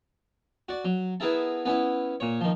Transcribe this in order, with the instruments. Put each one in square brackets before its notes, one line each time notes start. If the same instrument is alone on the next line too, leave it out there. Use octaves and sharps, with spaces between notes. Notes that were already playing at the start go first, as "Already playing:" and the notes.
[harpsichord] F#4 D5
F#3
B3 E4 G#4 A#4 E5 A5
B3 C#4 E4
A#2 C#5
D#3 F3